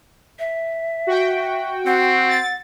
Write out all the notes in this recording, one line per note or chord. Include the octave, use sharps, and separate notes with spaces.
E5
F#4 G5
C4 F#5
A6